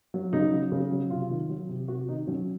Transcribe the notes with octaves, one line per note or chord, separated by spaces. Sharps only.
F#3
C#3 D#4
F#3
C#3
F#3
C3 F4
D#3
F#3
C3
C3 F#4
D#3 D#4
F#3 C#4